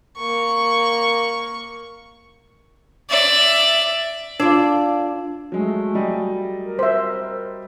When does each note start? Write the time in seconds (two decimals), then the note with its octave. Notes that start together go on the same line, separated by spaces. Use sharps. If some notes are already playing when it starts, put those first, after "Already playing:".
0.18 A#3 C#6
3.10 D5 E5
4.40 D4 F4 D5
5.52 F#3 G#3 A3
5.95 F#3 G3 D#5
6.62 A#4
6.79 C5 E5